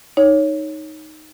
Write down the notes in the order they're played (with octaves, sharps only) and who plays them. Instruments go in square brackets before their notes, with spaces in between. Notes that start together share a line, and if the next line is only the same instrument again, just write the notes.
[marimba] D#4 C#5